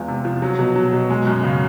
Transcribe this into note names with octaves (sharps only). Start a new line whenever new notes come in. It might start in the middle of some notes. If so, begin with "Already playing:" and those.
Already playing: E2 G#3 F4
C3
F3
F#3
B2
F#3
B2
G#3
F#2
C#3